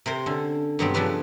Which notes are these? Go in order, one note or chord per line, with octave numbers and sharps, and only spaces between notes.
C3 A#4 C5
D3 C#4 A4
G2 B2 F#3 B3 C4 G4
C#3 F3 D4 A4 B4 C#5